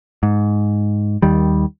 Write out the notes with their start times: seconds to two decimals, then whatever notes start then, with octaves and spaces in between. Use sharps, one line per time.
0.23 G#2
1.22 D#2 D#3 G3